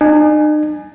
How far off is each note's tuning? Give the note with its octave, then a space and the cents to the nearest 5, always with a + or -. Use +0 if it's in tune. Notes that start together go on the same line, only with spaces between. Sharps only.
D#4 -45 G#5 +5